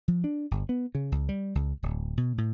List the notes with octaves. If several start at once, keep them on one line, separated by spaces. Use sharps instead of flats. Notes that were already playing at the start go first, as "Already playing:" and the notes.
F3
D4
G1
B3
C#3
C#2
G3
C#2
D1
B2
A2